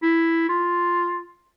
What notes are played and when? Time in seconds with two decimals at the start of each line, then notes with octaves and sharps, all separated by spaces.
0.03 E4
0.49 F4